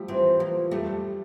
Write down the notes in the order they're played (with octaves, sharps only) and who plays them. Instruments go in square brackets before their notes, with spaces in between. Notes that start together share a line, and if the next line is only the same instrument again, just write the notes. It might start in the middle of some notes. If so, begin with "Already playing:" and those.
Already playing: [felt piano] F3 G3 A3
[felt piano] E3 [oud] C4
[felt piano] F3 [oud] A#3
[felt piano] G3 [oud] A3